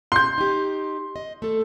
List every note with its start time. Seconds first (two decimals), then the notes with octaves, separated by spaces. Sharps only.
0.12 C6 G6
0.38 D#4 G4
1.16 D#5
1.42 A3 A4